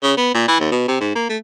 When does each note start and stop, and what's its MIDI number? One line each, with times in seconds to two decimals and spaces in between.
0.03 0.13 49
0.17 0.32 59
0.34 0.47 46
0.48 0.58 52
0.60 0.71 39
0.72 0.87 47
0.88 0.99 48
1.00 1.12 44
1.15 1.26 58
1.29 1.37 57